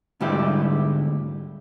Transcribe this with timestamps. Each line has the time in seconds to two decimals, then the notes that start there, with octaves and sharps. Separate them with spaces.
0.20 D2 G#2 G3 E4 G4